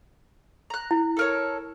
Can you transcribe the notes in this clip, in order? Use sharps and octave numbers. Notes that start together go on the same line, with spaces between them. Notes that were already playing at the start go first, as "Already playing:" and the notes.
A#5 F#6
E4
A4 A#4 C#5